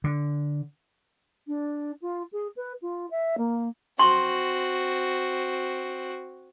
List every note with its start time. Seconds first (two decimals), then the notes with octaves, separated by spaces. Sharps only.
0.04 D3
1.47 D4
2.01 F4
2.32 G#4
2.56 B4
2.81 F4
3.10 E5
3.37 A#3
3.99 C4 F#4 C6 C#6